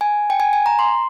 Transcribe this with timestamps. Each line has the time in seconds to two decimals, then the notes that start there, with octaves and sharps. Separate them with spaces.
0.01 G#5
0.30 G5
0.40 G#5
0.53 G#5
0.66 A#5
0.79 C6